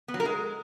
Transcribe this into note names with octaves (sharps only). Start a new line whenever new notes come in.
B3
F#3
A#4
G#3